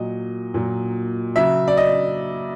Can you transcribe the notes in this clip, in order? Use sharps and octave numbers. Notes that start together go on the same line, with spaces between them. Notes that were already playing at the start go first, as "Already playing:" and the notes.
Already playing: A#2 F#3 D#5
A#2 F#3
C#3 F#3 E5
D5
D#5